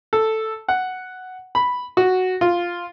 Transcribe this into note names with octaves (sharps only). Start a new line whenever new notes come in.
A4
F#5
B5
F#4
F4